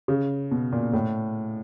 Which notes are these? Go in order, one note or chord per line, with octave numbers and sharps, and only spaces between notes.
C#3
B2
A#2
A2